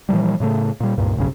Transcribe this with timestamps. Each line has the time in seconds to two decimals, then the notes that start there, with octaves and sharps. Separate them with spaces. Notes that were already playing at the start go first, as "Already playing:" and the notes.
0.09 A#2 E3 F3 G3
0.40 A2 C#3 G3 A3
0.80 A#2 G3
0.98 C#2 G2 A#2
1.16 F1 B1 G2 C#3